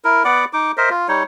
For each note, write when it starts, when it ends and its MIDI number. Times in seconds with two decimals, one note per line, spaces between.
0.04 0.23 64
0.04 0.23 70
0.25 0.45 59
0.25 0.45 74
0.25 0.45 78
0.25 0.45 86
0.53 0.72 63
0.53 0.72 86
0.77 0.89 70
0.77 0.89 72
0.77 0.89 75
0.77 0.89 76
0.90 1.08 65
1.08 1.23 55
1.08 1.23 63
1.08 1.23 73